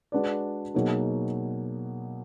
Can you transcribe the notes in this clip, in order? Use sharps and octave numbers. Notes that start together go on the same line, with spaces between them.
G#3 D4 F#4 B4 D5
B2 F#3 A#3 D#4 G#4